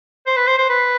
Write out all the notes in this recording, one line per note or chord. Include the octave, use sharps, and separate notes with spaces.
C5
B4
C5
C5
B4